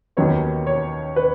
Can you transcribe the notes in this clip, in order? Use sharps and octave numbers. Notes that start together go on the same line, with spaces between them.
D#2 D#3 F#3 B3 C#5
C#5
B4